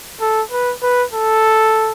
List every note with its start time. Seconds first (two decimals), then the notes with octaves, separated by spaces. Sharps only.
0.21 A4
0.52 B4
0.83 B4
1.13 A4